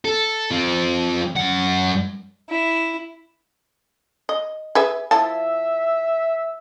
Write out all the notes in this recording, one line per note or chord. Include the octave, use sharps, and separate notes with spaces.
A4
F3 C4
F#2 F#5
E4
D#5
G#4 B4 E5
F3 E4 E5 A5